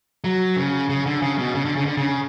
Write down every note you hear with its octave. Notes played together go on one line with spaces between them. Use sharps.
F#3
C#3
C#3
D3
C#3
B2
C#3
D3
C#3
D3
C#3